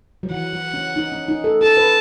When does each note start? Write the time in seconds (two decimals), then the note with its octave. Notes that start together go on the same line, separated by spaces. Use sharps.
0.23 F#3
0.30 E3 F#5
0.53 F#3
0.74 C#4
0.96 D#4
1.12 C#4
1.29 D#4
1.44 A4
1.61 A4 A5
1.77 B4